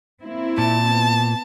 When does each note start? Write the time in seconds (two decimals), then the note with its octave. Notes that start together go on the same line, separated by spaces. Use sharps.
0.23 A#3 C4 E4
0.58 A#2 A5
0.90 B3